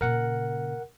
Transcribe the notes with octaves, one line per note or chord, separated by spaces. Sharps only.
A#2 C#3 A#4 F#5